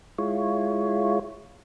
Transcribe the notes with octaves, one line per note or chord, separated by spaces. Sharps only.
G#3 E4 F4 C#5